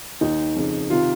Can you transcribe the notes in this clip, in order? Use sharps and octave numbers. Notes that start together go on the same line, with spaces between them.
D#2 D#3 D#4
F2 C#3
C3 D#3 F4